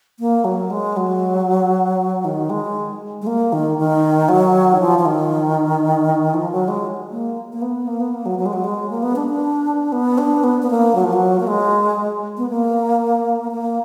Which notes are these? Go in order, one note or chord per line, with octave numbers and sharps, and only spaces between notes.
A#3
F#3
G#3
F#3
D#3
G#3
G#3
A#3
D#3
D#3
F#3
D#3
F3
F3
D#3
F3
F#3
G#3
A#3
A#3
B3
A#3
B3
A#3
F#3
F#3
G#3
F#3
G#3
A#3
B3
D4
D4
B3
D4
B3
B3
A#3
F#3
F3
F#3
A#3
G#3
B3
A#3
A#3